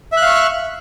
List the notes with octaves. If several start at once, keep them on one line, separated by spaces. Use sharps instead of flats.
E5 F5 C#6 F#6